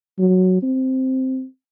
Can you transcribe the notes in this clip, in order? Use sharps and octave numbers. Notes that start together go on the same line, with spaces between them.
F#3
C4